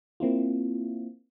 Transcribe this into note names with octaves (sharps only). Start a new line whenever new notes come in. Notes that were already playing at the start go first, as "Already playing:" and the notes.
A#3 C4 E4 F4